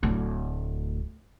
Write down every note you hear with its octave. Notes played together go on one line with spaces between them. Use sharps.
D1 D2